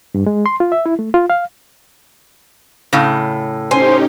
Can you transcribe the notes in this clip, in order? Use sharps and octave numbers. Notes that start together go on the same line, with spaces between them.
G2
G#3
C6
F4
E5
E4
A3
F4
F5
A2 C#3
C#4 D#4 G4 C5 G#5